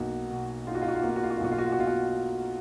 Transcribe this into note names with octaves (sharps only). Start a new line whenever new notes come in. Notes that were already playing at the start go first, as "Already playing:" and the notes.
Already playing: B1 A#3 D#4 F#4
B2
D#4 F4
F#4
F4
F#4
F4
A#3 F#4
F4
F#4
F4
F#4
F4
B1 F#4
F4
F#4
F4
F#4
B2 F4
F#4